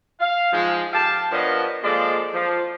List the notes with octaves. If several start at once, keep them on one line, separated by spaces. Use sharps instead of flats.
F5
G#2 F3 G#3
G4 F5 G5 A5
F3 B3 D4 A#4 C#5 D#5
F3 G#3 A#3 A4 D5
F3